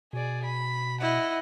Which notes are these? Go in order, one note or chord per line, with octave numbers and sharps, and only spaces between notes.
B2 G#4 D5
B5
E4 D#5 F#5